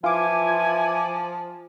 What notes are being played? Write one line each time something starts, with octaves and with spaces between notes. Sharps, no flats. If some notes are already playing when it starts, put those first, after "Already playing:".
E3 F3 F4 G#5 D6